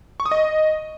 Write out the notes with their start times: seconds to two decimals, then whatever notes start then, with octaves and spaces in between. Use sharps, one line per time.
0.20 C#6
0.26 D#6
0.31 D#5